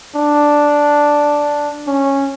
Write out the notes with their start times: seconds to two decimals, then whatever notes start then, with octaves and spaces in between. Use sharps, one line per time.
0.16 D4
1.87 C#4